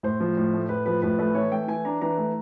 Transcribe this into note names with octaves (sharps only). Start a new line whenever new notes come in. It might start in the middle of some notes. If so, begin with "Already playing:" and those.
A2 C5
F3
A2
A3
A2 B4
F3 B4
A2 B4
A3 B4
E3 C#5
A3 G5
E3 G#5
D4 A#5
E3 A#5
A3